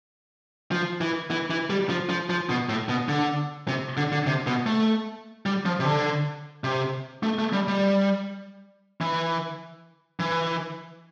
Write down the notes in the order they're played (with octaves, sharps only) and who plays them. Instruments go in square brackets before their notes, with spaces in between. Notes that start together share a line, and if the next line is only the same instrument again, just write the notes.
[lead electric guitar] F3
E3
E3
E3
G3
F3
F3
F3
B2
A2
B2
D3
C3
D3
D3
C3
B2
A3
G3
F3
C3
D3
C3
A3
A3
G3
G3
E3
E3